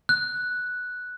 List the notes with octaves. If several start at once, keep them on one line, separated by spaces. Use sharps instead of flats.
F#6